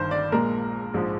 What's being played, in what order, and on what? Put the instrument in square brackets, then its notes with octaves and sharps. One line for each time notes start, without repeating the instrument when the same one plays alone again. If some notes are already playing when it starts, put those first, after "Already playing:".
Already playing: [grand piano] G1 G2 D#3 C5
D5
A#1 A#2 G#3 A#4
A#1 G#2 F3 G#3